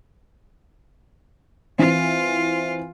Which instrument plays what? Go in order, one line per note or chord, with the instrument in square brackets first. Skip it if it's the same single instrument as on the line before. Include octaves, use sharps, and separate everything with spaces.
[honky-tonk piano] E3 C4 [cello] F4